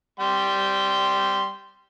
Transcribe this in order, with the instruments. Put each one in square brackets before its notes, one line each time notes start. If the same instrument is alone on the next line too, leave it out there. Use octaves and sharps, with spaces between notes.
[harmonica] G3 G5 C6